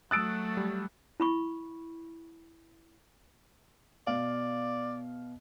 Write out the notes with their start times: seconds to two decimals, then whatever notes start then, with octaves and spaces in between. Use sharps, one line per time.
0.11 F#3 A3 D#6 E6 F#6 A6 D7
0.57 G3
1.20 E4 B5 C#6
4.07 B2 D5 F5